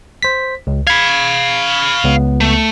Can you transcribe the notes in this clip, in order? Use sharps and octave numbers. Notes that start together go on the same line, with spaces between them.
C5 B6
C#2
F5 B5 G#6
C#2 B3
A3